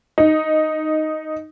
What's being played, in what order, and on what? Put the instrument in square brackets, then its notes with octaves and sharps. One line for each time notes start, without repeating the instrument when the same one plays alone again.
[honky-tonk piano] D#4